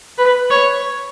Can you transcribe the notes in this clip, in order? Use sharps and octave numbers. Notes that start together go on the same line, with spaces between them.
B4
C#5